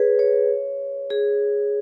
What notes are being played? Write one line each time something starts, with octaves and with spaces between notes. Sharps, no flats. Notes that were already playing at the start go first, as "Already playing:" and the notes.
Already playing: G#4 B4 C#5
C#5
G#4